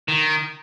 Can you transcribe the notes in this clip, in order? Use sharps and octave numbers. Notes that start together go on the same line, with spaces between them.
D#3